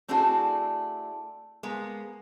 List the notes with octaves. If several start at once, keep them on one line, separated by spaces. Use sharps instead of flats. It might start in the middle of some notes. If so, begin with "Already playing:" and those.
A3 C4 D4 E4 F#4 G#4
G#3 A#3 B3